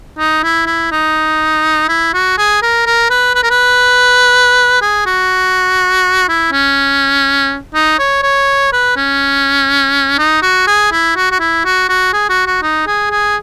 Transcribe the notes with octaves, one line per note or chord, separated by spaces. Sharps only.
D#4
E4
E4
D#4
E4
F#4
G#4
A#4
A#4
B4
B4
A#4
B4
G#4
F#4
E4
C#4
D#4
C#5
C#5
B4
C#4
D#4
F#4
G#4
E4
F#4
F#4
E4
F#4
F#4
G#4
F#4
F#4
D#4
G#4
G#4